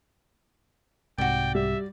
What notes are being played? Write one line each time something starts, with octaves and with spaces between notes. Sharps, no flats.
C2 G#2 C3 F#4 D5 G5
G3 E5